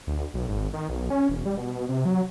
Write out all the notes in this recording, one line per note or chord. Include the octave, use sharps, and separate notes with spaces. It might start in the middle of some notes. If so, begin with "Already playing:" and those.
D2
B1
G#1
D#3
B1
C#4
E1
G3
B2
B2
C3
F#3